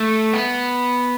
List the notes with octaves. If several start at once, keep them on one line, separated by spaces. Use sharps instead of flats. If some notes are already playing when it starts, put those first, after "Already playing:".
Already playing: A3
B3